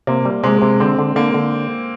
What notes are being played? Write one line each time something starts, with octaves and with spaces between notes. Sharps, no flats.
C3 A#3
G3
C3 G#3
C3
D3 C4
D3
D3 A#3
D3